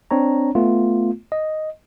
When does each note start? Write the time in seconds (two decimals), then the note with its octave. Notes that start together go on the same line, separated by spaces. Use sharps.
0.11 C4 D4 C#5 A#5
0.55 A3 B3 F4
1.32 D#5